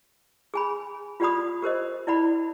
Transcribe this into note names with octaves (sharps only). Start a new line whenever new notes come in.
G#4 G#5 B5
F4 G4 D5 F#5 B5 D#6
G4 A#4 C5 D#5
E4 D5 F#5 B5